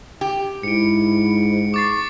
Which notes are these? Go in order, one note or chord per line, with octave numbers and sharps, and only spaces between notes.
G4
G#2 E4 C#7 D7
C#6 D6 A6 C7